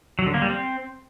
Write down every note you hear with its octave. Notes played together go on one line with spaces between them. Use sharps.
F#3
D3
A#3
G3
C4